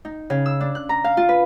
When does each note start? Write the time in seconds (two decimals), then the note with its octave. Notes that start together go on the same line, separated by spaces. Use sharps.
0.05 D#4
0.30 C#3
0.46 E6
0.60 D4
0.75 F#6
0.89 A#5
1.04 F5
1.17 F4
1.29 B4